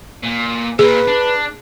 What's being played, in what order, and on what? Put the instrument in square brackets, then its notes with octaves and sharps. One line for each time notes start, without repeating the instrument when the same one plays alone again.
[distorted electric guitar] A#2
[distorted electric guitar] A#2 [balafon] G#4 [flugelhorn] B4
[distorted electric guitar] D4